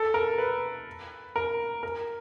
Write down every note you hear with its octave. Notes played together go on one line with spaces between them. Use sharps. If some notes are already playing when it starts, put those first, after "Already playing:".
Already playing: A4
A#4
B4
A#4
A#4